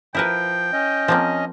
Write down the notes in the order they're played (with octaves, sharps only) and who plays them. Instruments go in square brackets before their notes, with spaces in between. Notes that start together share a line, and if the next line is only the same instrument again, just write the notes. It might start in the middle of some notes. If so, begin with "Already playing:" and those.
[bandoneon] F3 [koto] E4 A#4 B4 [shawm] G5
[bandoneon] C#4 D#5
[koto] F3 A#3 C4